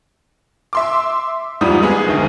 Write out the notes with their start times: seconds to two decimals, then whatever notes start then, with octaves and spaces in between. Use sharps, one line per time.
0.73 E5 C6 D6
1.61 E2 G#2 F3 G3 D#6
1.82 G#3 B3 G#4
2.06 F#1 D2 D#3